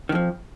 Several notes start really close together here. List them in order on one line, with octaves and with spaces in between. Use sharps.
D#3 F2 F3